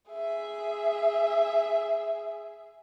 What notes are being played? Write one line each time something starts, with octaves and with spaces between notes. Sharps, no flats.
G#4 E5